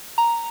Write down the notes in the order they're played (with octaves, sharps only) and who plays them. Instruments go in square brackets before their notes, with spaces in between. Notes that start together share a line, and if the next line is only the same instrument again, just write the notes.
[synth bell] A#5